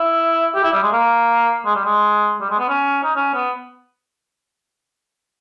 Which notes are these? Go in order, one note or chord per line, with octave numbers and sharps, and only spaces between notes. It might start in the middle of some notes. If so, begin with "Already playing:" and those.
Already playing: E4
G4
E4
G3
G#3
A#3
G#3
G3
G#3
G3
G#3
B3
C#4
D#4
C#4
B3